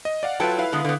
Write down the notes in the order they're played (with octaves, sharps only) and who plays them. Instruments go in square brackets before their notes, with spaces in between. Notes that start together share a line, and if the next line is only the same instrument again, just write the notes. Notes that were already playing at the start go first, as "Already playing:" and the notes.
[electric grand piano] D#5
D5 F5 F#5
[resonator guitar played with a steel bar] F#3 A4 G5 [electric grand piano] F4 B4 A5
[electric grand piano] E4 B4 F5
[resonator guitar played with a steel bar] D3 G#3 B3
D3 B3